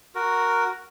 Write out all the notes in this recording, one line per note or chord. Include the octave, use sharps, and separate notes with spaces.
F#4 A#4